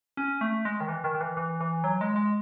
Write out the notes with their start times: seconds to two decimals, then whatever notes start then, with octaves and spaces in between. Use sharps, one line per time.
0.17 C#4
0.41 A3
0.65 G#3
0.81 D#3
0.88 E3
1.04 D#3
1.15 D#3
1.21 E3
1.37 E3
1.61 E3
1.84 F#3
2.01 G#3
2.16 G#3